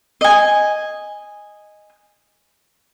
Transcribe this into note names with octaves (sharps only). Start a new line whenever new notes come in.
D#5 G#5